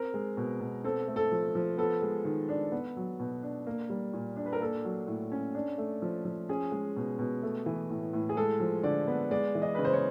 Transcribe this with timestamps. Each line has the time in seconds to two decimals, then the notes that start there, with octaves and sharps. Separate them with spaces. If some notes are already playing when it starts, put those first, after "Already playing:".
Already playing: C4 A#4
0.14 G#3
0.37 B2
0.61 B2
0.84 C4 A4
1.08 A3
1.16 A4
1.31 F3
1.55 F3
1.78 B3 A4
2.02 G#3
2.25 D#3
2.49 D4
2.72 B3
2.97 F#3
3.19 B2
3.43 D4
3.66 A#3
3.90 G3
4.13 A#2
4.36 D4
4.46 B4
4.53 A#4
4.60 A#3 A4
4.84 F#3
5.07 A2
5.32 C#4
5.54 D4
5.78 A3
6.02 F3
6.25 F3
6.49 C#4 G#4
6.72 G#3
6.96 B2
7.19 B2
7.43 A3
7.66 E3
7.90 A2
8.13 A2
8.29 G#4
8.37 G#3 A4
8.60 F3
8.83 D3 D5
9.07 B3
9.31 G#3 D5
9.55 E3
9.62 D#5
9.75 C#3 B4
9.85 C5
9.93 C#5